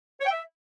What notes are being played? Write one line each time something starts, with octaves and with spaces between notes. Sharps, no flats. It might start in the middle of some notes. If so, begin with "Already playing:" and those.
C#5
G5
E5